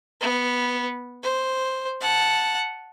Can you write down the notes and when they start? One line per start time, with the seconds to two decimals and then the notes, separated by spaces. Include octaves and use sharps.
0.21 B3
1.23 C5
2.01 F#5 A5